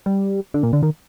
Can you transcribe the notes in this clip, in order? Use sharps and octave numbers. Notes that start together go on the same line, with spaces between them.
G3
D3
A#2
D3
D#3